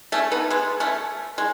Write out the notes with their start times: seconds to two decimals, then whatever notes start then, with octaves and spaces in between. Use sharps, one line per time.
0.12 A3 C#4
0.32 B3 D#4
0.50 G#3 B3
0.80 A3 C#4
1.38 G#3